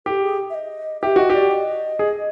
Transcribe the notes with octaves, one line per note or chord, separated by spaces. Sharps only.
G4 A4
G#4
E5
D#5
G4 E5
F#4 D#5
G4 D5
D#5
G#4